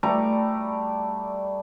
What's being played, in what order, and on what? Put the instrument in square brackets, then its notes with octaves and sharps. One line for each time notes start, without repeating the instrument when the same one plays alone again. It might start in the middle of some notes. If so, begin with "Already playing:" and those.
[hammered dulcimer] G3 A3 D5 A#5